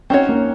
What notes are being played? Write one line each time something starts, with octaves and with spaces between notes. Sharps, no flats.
C4 C#4 D#4 F#4 C#5
A#3